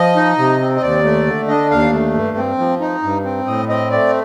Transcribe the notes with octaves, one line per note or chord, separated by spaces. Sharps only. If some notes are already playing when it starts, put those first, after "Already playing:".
Already playing: F3 D#5
D#4
C3
C4
D#5
D#2 D5
A3
D3
D4 D#5
D#2 F5
A3
G2
C4
F3
D#4
G2
C4
A2 D#5
C4 D#5
A3 D5